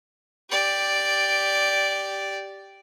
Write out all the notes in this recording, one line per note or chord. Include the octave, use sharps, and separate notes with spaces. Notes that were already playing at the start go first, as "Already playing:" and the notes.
G4 D5